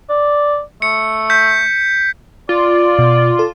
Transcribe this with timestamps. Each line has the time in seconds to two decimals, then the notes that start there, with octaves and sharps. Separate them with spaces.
0.09 D5
0.82 A3 C#7
1.30 G6 B6
2.49 F4 D5
2.99 B2
3.39 A4